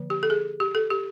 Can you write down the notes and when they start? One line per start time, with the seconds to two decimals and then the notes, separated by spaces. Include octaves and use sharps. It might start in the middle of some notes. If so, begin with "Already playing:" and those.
Already playing: D3 F3 A#3
0.10 G4
0.23 A4
0.30 G#4
0.60 G4
0.75 A4
0.90 G4